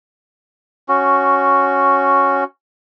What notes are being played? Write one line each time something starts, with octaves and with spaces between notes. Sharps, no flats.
C#4 F#4